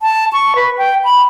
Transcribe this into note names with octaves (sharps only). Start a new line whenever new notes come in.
A5
C#6
B4
G5
B5